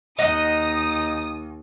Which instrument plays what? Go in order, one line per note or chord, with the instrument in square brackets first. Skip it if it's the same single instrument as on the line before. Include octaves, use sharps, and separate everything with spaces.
[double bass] D#2 [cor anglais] D#4 [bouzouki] D#5 F#5 [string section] D#6